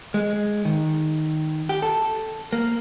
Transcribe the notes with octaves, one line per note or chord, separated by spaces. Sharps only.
G#3
D#3
G4
A4
A#3